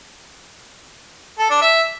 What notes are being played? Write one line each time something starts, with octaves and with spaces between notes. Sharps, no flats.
A4
D4
E5